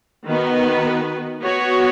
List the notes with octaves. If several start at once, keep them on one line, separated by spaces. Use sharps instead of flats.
D#3 B3 F#4 B4
B3 F#4 C#5